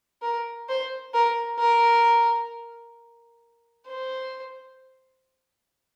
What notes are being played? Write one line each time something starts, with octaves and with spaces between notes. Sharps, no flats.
A#4
C5
A#4
A#4
C5